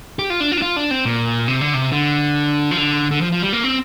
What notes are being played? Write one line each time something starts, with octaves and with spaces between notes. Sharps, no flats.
G4
F4
D4
F4
D4
F4
D4
C4
A#2
C3
D3
C3
D3
F3
D3
D3
F3
F3
G3
A#3
C4